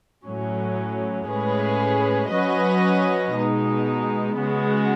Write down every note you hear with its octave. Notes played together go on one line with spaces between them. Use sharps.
A2 F#3 C#4
A2 G#3 C#4 G#4 B4
F#3 C#4 F#4 B4 D#5
B2 G#3 D#4
C#3 G#3 B3 F#4